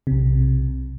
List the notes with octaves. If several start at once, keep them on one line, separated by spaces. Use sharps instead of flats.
B1 C3